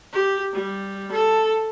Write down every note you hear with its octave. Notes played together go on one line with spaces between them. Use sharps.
G4
G3
A4